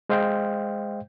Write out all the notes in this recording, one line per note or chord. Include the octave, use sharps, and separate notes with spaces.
G#3 C5 D#5 F5 G5